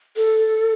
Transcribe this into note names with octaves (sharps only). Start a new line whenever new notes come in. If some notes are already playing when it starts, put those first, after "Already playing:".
A4